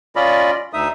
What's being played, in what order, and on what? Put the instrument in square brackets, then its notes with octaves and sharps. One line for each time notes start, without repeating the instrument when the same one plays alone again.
[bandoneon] C#4 F4 D5 D#5 B5
D2 D#4 E5 D#6